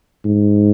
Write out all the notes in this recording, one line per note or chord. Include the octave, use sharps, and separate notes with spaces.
G#2